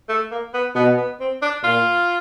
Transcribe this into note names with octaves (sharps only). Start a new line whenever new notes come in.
A3
A#3
B3
B2 B3
B3
C4
D4
A#2 F4